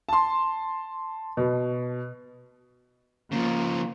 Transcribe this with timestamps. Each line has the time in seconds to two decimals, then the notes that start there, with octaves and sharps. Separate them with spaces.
0.09 A5 C6
1.37 B2
3.32 C#3 F3 A#3